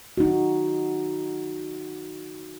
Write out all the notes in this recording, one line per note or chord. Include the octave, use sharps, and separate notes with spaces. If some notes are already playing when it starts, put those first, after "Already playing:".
D#4 F#4